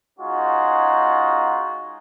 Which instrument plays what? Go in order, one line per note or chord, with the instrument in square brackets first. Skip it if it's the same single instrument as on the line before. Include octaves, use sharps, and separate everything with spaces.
[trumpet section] G#3 C#4 D#4 F4 F#4